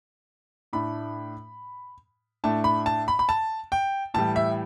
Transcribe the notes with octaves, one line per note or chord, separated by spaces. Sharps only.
A2 A3 D4 B5
A2 A3 D4 A5
B5
A5
B5
B5
A5
G5
A2 E3 G3 A5
E5